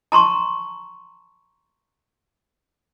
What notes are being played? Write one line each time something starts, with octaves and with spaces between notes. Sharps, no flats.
A5 A#5 C6 C#6